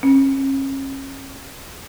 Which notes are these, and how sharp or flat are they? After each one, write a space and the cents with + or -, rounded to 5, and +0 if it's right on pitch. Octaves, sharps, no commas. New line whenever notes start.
C#4 -35